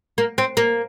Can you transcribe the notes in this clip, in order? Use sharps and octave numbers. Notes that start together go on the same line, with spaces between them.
A#3
C4
A#3